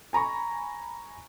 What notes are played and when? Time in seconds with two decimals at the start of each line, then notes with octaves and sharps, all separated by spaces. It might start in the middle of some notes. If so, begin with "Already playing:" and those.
0.13 G#5 A#5 B5 C#6